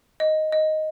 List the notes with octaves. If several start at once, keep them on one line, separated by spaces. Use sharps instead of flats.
D#5
D#5